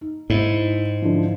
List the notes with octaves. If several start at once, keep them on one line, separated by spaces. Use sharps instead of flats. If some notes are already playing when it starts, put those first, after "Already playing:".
D#4
G#2 E4
D3 E3 F3